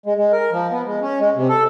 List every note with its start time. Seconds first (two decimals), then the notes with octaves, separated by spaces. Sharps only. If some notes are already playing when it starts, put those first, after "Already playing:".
0.06 G#3
0.17 G#3
0.33 A#4
0.52 F3
0.72 B3
0.86 G#3
1.02 C#4
1.20 G#3
1.36 C3
1.49 A4